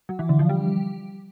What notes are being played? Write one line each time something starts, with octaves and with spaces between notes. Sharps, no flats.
F#3
E3
D3
F3
G3